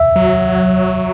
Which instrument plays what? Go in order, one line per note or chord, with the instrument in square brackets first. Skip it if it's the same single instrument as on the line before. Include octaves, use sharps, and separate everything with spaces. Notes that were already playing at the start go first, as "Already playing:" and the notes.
Already playing: [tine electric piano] E5
[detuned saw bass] F#3